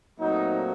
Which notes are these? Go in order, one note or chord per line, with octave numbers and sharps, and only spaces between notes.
A#2 F#3 A3 C4 D#4